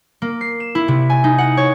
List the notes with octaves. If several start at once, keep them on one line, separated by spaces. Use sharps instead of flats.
A#3
C7
E7
E4
C3
G#5
D#4
F#5
C#5